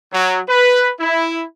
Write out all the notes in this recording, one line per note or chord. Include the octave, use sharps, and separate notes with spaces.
F#3
B4
E4